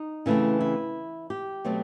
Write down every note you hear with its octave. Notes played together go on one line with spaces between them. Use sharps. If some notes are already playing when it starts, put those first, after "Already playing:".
Already playing: D#4
C#3 E3 A3 C4 E4
E4
G4
B2 F#3 A3 C4